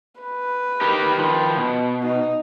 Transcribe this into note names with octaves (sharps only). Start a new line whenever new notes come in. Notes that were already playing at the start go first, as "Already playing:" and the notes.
B4
D#4 G4 A#4
D#3 F3
B2
D#4